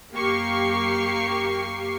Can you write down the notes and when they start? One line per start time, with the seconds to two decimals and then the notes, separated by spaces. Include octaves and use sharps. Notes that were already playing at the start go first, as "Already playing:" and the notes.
0.15 F#2 A#3 G4 C#6 C7